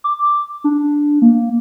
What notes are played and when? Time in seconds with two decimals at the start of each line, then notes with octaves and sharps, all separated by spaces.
0.04 D6
0.64 D4
1.22 A#3